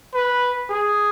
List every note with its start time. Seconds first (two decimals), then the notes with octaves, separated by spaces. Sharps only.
0.14 B4
0.70 G#4